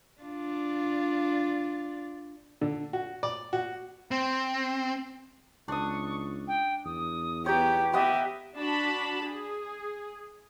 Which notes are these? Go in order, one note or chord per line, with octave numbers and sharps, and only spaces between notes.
D4 F4 D5
D3
F#4
D5
F#4
C4
C#2 D4 C#6 D#6
G5
E2 D#6
B3 G4 C#5 A#5 G6
B3 G4 D#5 E5 F#5 D#6
D4 F#4 A5 B5
G#4